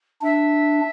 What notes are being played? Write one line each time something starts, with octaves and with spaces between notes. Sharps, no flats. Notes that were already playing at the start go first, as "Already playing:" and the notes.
D4 E5